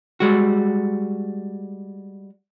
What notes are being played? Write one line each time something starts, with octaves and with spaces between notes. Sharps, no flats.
G3 G#3 F#4